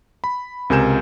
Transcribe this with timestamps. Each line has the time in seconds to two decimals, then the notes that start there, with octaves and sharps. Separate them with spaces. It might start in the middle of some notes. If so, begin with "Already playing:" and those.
0.24 B5
0.70 C#2 C3 A#4 G#5 G6 E7